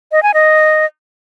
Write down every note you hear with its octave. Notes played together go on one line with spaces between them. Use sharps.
D#5
G#5
D#5